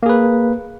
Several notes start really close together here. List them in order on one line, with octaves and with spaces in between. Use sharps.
A#3 G#4 B4